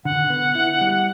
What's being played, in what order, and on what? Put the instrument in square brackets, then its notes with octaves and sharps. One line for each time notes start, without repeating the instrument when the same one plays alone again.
[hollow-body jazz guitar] D3 [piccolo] F#5
[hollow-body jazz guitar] B3
E4
G3